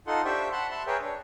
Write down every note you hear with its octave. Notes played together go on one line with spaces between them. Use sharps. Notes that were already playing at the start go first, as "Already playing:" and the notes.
D#4 F4 A4 F#5 C6
D4 G4 C5 E5 G5 C#6
F#5 A5 B5 C6
E5 A5 B5 C6
G#4 A#4 B4 C#5 E5 G5
D4 C#5